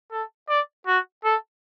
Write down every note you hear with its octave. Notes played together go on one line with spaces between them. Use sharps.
A4
D5
F#4
A4